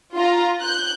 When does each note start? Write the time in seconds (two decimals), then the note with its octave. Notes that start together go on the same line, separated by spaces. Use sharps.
0.15 F4 A#5
0.60 F#6 G6